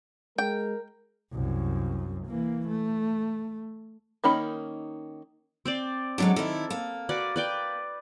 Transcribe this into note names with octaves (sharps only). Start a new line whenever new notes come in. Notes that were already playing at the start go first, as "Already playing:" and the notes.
G#3 A#4 G5
C2 F#2
E3 A#3
A3
D#3 A#3 C#4 D#4 B5
C4 C5 D5
D3 F#3 G#3 A4 D6
D#3 E4 A4
A#3
F#4 B4 D5
B4 D5 G5